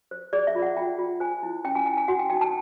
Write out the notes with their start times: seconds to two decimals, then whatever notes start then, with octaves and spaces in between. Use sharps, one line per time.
0.11 C5
0.33 G#4 D5
0.47 E5
0.55 F4
0.62 F#5
0.77 F4 G5
0.99 F4
1.20 C5 G#5
1.43 E4
1.64 C#4 G5
1.75 G#5
1.86 E4 G5
1.97 G#5
2.08 F#4 F#5
2.19 G5
2.30 D#4 G5
2.41 A5